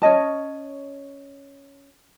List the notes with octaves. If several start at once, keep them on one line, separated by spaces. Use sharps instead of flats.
C#4 C#5 D#5 A5